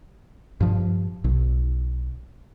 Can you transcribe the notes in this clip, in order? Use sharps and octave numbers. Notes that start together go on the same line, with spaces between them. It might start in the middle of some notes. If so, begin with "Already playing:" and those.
G2 F3
B1